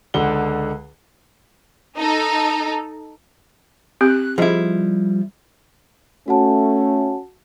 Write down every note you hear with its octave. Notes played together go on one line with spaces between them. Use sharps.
C#2 D3 F#5 G7
D#4 A4
C4 G4 F#6
F3 G3 E4 G#4 D#5
A3 C#4 F#4 F#5 A5